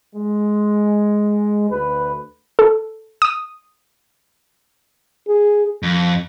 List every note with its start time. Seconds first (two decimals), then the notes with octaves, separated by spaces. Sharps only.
0.14 G#3
1.69 D2 B4
2.59 A4
3.22 D#6
5.28 G#4
5.83 F2